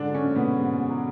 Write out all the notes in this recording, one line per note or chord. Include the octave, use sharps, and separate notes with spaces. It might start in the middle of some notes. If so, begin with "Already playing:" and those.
Already playing: G#2 D3 D4
F#3
C#3 C#4
G#2
B2 B3
G#2
G#2
G#2
F#3